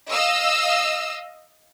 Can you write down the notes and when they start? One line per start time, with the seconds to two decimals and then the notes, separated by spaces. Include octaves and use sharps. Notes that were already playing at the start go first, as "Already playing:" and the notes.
0.11 D#5 F5 E6